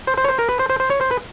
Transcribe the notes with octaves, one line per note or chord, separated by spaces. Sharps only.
C5
C5
C#5
C5
A#4
B4
C5
C5
C5
C#5
C5
B4